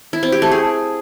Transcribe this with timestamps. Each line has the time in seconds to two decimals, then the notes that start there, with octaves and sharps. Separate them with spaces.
0.13 E4
0.23 C4
0.32 G4
0.42 A3
0.52 G#4